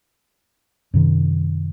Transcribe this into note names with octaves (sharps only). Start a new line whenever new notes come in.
F#2 C3 D#3